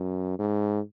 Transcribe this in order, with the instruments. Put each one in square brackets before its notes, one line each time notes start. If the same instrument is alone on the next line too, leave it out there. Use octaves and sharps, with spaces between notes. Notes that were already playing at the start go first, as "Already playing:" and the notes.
Already playing: [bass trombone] F#2
G#2